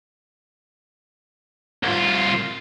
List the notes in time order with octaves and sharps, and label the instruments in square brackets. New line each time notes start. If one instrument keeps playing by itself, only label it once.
[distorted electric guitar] C2 F4